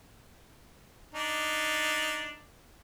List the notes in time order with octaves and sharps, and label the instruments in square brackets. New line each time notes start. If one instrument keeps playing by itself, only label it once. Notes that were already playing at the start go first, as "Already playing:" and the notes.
[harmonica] D4 D#4